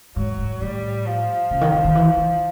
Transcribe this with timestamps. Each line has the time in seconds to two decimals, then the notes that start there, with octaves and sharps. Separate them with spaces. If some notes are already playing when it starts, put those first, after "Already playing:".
0.16 G#2 F#3
0.39 G#2
0.61 A2 G3
1.07 F3
1.51 C#3
1.61 D#3
1.73 D3
1.85 D#3
1.95 E3
2.17 D#3